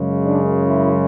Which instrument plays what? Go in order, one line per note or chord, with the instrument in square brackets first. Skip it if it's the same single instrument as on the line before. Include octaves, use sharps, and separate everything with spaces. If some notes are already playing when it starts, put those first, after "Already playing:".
Already playing: [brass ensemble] F#2 C#3 G#3
D4
E4